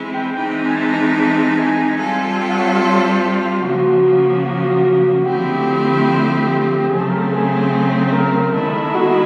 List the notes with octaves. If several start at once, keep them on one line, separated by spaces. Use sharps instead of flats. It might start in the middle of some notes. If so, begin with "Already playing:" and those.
Already playing: E3 G#3 C4 E4
G5
E3 G#3 C4 D#4 G5
G#5
A5
G#5
G3 C4 F4 A4
G5
F#5
C#5
C#5
C5
C#3 F3 A#3 F#4
F#4
D3 F3 A3 C4 E4 G4
C#3 F#3 A3 C4 G#4
A4
A#4
A4
G#4
A#4
D#3 G#3 B3 E4 A4
F#4